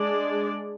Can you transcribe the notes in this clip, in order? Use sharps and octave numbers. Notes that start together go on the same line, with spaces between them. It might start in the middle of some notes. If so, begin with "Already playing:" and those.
Already playing: G#3 D4 G#4 D5